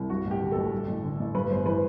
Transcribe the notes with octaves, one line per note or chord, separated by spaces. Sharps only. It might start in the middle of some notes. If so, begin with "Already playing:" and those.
Already playing: C2
G2 F#4
A1
G4
D3
A1 A4
G2
A1
D3
A1
G2 B4
G1 C5
E3 B4